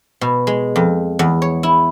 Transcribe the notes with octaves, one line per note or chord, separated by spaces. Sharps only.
B2
G#3
F2
E2
C#5
E4